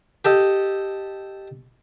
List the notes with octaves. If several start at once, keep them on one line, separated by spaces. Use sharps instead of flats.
G4 A4 D#5